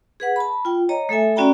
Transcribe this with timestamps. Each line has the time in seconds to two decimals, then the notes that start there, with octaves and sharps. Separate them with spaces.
0.20 G#4 B4 F#5
0.36 A5 B5
0.65 F4 G5
0.89 C#5 D#5 A#5
1.09 A3 A4 E5 G#5
1.36 C#4 F#4 D5 G5 A#5 B5